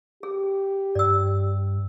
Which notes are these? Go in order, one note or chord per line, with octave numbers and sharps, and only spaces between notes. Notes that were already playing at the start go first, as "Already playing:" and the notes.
G4 G#4
G2 D5 E6